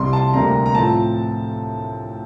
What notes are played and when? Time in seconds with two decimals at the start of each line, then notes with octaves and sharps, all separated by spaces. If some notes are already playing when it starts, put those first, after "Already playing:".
Already playing: C2 C3 G3 C6
0.13 A5
0.34 D2 C3 G3 A#3 A#5
0.66 A#5
0.75 A2 F3 C4 A5